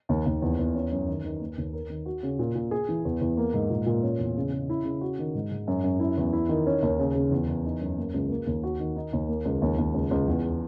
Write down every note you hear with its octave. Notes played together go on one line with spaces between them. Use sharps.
D#2
D#2
E2
E2
C#4
F#2
D#3
D#3
A#3
D#2
A#4
D#3
F#4
C#3
A#2
A#2
G#4
E3
E2
E2
A#3
G#2
A#2
A#2
C#4
E2
C#3
C#3
E4
C#3
F#4
D#3
G#2
G#2
F#2
F#2
E4
E2
E4
D#3
C#4
D#2
C#3
C#3
E2
E2
D#4
F#2
A#3
C#2
A#3
D#2
F#4
D#3
D#4
D#2
A#3
C#2
D#2
D#2
C#2
C#2
E2